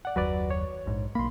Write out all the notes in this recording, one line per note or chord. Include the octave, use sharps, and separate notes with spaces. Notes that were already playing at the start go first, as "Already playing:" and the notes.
D5 F#5
F#1 D#2 F#3 F#4 B4 D5
C#5
A#1 G#2
B1 A#3 B5 C6